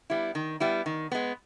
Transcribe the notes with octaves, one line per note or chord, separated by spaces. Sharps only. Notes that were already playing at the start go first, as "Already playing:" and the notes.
G3 B3 E4
D#3
G3 B3 E4
D#3
G#3 B3